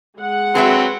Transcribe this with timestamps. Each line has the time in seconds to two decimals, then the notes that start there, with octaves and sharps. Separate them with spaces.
0.20 G#3 F#5
0.55 F#3 C4 G#4 B4 E5